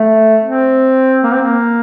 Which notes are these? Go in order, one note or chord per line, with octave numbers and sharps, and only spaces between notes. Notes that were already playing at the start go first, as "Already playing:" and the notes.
Already playing: A3
C4
A#3
C4
A#3